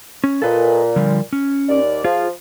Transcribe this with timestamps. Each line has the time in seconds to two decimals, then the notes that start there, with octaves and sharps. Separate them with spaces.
0.24 C#4
0.42 A#2 A4 B4 D#5
0.96 D3 F3 G3
1.33 C#4
1.69 D#2 D5
2.04 F3 F4 G#4